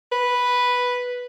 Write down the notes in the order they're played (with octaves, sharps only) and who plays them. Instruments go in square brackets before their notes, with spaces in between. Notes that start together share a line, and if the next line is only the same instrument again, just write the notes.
[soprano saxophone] B4